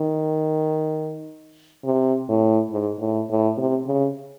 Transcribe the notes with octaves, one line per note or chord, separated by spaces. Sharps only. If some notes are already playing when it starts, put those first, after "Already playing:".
Already playing: D#3
C3
A2
G#2
A2
A2
C3
C#3